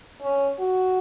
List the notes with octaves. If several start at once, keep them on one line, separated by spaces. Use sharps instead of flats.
C#4
F#4